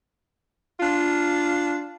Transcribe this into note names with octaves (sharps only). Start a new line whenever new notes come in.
D4 F4